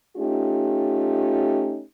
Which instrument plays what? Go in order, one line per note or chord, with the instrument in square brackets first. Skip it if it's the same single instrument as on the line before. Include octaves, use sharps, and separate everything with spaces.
[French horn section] A3 C#4 D#4 F4 G4